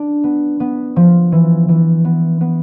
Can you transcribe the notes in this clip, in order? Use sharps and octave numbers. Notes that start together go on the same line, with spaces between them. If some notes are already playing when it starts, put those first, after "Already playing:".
Already playing: D4
B3
B3
F3
E3
E3
B3
B3